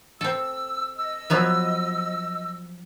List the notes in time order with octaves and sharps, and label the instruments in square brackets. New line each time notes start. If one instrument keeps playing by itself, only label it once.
[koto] C4 A4 [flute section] E6
[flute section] D#5 E6
[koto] F3 F#3 B3